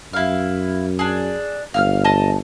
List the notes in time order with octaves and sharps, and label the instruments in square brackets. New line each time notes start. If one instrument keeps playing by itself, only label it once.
[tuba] F#2 [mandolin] E4 F5
[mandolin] D4 G#4
[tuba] G1 [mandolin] F5 E6 F6
[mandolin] D#5 A5